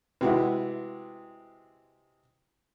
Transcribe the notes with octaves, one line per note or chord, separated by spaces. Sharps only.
C3 G#3 E4 F#4 B4